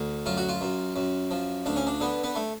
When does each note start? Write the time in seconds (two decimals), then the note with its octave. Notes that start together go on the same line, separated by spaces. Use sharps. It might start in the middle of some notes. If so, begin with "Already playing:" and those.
Already playing: D2
0.26 F#2 F4
0.37 F#4
0.49 F4
0.61 F#2
0.96 F#2
1.31 F3
1.66 D2 D4
1.76 C#4
1.87 D4
2.00 D3 B3
2.24 B3
2.35 A3